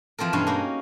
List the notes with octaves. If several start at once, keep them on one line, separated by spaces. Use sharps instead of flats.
E3 F3 C4 A4 A#4
G2 B2 C#4 F5
A#3 D#4 F#4